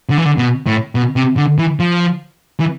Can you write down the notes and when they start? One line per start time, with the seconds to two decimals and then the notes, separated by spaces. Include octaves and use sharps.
0.10 D3
0.18 E3
0.26 D3
0.38 B2
0.67 A2
0.95 B2
1.16 C3
1.37 D3
1.58 E3
1.80 F3
2.60 E3